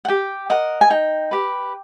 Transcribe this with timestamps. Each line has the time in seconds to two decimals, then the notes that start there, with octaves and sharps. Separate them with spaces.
0.05 F#5
0.08 G4 G5
0.50 A#4 D#5 F#5
0.81 G#5
0.90 D#4 G5
1.31 G4 B4